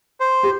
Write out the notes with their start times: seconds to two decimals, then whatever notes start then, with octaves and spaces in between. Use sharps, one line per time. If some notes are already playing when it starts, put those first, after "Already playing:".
0.20 C5
0.43 G4